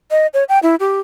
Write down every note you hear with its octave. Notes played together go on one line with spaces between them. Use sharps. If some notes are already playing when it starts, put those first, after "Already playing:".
D#5
C#5
G5
E4
G4